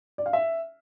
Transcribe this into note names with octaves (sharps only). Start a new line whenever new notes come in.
D5
F5
E5